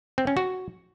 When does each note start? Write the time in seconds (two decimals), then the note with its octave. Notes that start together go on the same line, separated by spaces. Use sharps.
0.18 C4
0.27 C#4
0.37 F#4